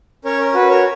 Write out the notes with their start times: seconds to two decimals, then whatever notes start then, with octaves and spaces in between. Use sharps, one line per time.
0.25 C#4 A#4 C#5
0.40 A#4
0.54 F#4 B4
0.69 A#4 C#5